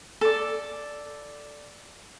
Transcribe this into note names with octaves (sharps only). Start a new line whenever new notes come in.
A4 D5